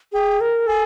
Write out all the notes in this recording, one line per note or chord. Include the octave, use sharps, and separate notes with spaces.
G#4 G5
A#4
A4 G#5